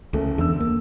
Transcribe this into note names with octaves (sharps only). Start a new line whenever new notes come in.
F#1 C#2 A3
E2 D3 E6
A#3